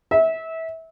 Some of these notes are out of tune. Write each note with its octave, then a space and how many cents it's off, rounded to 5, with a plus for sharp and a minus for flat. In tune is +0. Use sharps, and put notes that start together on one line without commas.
E5 -25